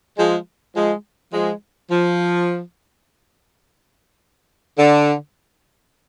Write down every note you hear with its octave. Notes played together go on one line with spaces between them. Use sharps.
F3 G#3
F3 G#3
F3 G#3
F3
D3